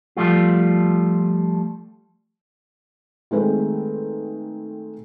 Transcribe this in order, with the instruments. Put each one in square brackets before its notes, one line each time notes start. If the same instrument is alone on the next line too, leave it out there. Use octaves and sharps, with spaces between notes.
[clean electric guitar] F3 G3 A3 F4
[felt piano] D#3 G#3 A3 C4 B4